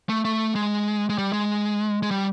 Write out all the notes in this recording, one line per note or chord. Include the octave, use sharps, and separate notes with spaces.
A3
A3
G#3
G#3
G3
G#3
G#3
G3